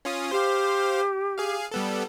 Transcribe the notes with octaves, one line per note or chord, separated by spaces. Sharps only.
C#4 F4 D#6
G4 C5 F5
G#4 F5
G3 B3 A4